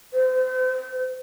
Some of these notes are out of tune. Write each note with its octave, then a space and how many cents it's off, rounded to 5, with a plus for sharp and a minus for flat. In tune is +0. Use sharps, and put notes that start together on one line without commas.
C5 -35